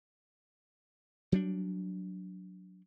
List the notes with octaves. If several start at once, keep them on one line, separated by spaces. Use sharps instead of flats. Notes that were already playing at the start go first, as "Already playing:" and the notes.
F#3 G3 D4